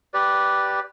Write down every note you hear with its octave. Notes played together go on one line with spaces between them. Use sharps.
G4 B4 D5